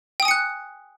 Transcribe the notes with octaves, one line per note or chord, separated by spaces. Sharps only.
G5 G#5 D#6 F#6 C#7